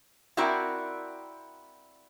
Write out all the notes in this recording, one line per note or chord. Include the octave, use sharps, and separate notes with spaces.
C4 E4 F#4 A#4 D5